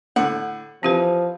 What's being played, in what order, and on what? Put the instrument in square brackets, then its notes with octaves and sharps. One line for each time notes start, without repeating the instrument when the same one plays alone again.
[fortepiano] A2 D3 [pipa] F#5
[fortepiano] E3 [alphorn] F3 [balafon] C4 G4 B4